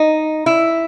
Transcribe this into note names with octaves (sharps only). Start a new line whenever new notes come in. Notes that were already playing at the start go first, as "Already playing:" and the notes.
Already playing: D#4
E4